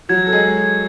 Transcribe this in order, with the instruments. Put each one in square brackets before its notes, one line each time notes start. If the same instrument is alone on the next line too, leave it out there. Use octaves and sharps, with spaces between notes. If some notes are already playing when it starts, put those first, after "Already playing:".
[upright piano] F#3 F#4 [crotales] G#6
[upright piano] A4
G#3 G#4